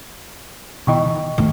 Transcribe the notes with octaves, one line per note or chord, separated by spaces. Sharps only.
B2 D#3 E3 D#5 G5 C#6
F#2 A2 D#3 A3